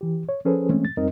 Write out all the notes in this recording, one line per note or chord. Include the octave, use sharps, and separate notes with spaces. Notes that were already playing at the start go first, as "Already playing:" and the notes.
E3 G4
C#5
F3 C#4 G#4 A4 B4 C5
E3 G#3 A3 C4 C#4
A6
F2 G3 C4 D#4 A#4 D#5